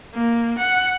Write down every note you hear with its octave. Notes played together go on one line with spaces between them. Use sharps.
A#3
F#5